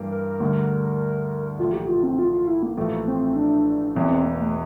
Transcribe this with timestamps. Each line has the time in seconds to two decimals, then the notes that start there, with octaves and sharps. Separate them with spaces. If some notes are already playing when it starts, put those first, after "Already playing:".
Already playing: G2 E3 A#3
0.11 A#4
0.40 D2 D3 G3
1.58 A#1 A2 E3 A3 F4
1.73 G4
1.88 F4
2.03 C4
2.19 F4
2.33 F4
2.47 E4
2.63 A#3
2.77 A1 A2 F3 A3 A#3
3.07 C4
3.36 D4
3.95 E1 E2 E3 C4
4.10 C4
4.25 A#3
4.40 A3